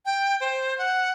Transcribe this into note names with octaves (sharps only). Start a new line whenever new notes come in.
G5
C5
F#5